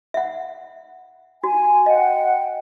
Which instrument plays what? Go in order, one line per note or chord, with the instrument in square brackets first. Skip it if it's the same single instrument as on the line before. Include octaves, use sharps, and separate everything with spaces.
[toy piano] E5 F#5
[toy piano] F#4 [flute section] G#5
[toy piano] D#5 [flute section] F#5 G5